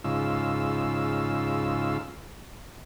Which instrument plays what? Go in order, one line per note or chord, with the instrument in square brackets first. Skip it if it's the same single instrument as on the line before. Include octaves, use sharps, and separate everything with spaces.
[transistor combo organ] G#2 C#3 F4 E6